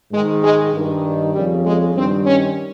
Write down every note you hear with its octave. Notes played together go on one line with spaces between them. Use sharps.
G#2 D#3 G#3
G#3
G2 D#3
F2 C#3 G3
G#3
G2 D#3 C4
C#4